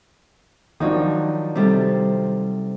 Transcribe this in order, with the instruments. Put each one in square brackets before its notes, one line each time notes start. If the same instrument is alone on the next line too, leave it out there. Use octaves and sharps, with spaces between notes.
[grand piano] D#3 F3 D4 [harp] F#3 D#4
[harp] C3 G3 A4